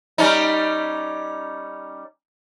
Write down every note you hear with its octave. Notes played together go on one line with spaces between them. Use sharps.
G3 C#4 D#4